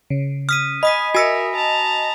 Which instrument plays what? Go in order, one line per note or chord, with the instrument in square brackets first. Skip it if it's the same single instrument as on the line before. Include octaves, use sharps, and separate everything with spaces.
[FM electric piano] C#3
[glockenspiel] D#6 B6 D#7 [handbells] F6
[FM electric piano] D#5 [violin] G#5 [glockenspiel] B5 D#6 B6
[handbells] F#4 E6 C#7 [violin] A#4 E5 [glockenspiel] G#5 A#6 B6
[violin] A5 A#5